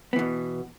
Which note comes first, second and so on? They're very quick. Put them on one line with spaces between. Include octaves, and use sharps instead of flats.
B3 E3 B2